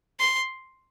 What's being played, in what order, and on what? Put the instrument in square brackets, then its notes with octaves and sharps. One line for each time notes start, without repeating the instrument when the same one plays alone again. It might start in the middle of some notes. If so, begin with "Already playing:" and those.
[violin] C6